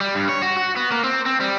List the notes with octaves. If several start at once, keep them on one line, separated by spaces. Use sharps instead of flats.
G3
G2
C#5
F#4
F#4
B3
A#3
C4
C4
G3